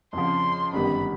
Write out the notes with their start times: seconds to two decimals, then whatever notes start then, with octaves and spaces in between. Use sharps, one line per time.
0.13 F2 C#3 F3 C6
0.73 G1 F#2 D#3 G3 B3 B5